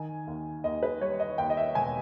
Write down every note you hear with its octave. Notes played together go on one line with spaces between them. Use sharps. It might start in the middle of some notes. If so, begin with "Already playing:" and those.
Already playing: D#3 G#5
D#2
D#2 D#5
B4
G3 C#5
D#5
D#2 G5
D#5
E5
E1 G#5